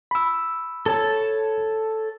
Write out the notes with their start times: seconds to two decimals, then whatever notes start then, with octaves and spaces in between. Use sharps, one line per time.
0.11 B5 E6
0.86 A4 C#5 A5